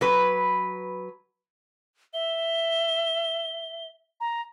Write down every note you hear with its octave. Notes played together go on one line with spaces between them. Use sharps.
F#3 B4
E5 G7
A#5